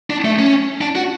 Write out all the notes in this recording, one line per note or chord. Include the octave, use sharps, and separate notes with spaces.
D4
A3
C#4
D4
F#4